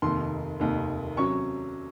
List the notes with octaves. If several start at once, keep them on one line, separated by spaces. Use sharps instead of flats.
F1 D#2 D#3 C6
F1 D#2 D#3
C3 F#3 C#4 C#6